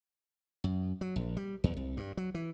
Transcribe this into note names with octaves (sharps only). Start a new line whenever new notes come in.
F#2
F#3
A#1
G3
E2
C2
G2
F#3
E3